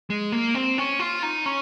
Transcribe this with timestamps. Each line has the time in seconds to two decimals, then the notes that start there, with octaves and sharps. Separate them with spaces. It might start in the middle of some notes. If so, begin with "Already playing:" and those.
0.10 G#3
0.32 A#3
0.55 C4
0.78 C#4
1.00 F4
1.23 D#4
1.46 C#4